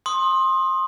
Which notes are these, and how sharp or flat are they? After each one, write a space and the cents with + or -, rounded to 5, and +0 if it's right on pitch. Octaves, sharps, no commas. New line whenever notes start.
C6 +20 D#6 +0